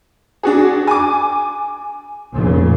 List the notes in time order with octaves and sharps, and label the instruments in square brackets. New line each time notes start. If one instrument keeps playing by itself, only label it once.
[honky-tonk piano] D4 F#4 G#4
G#5 D6
[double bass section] F1 A#2 C#3